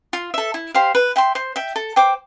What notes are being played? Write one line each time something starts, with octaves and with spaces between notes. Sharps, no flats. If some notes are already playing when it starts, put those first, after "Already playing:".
F4
A4 E5
E4
G4 C5 F5
B4
E5 G5 C6
C5
E5 G5
A4
C5 G5 D6